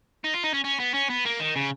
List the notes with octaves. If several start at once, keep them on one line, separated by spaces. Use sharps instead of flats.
D#4
F4
D#4
C#4
C#4
B3
C#4
B3
A#3
D#3
C#3